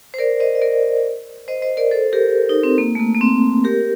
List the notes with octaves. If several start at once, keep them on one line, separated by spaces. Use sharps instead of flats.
C5
A#4 D5
C5 D#5
D#5
A#4 D5
C5 D#5
C5 D#5
A#4 D5
A4 C5
G4 A#4
D#4
C4
A#3
A3
A#3
A#3
C4
G4 A#4